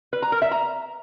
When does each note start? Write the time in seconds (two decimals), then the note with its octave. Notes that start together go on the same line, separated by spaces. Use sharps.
0.13 B4
0.22 A#5
0.32 A#4
0.42 E5
0.51 A#5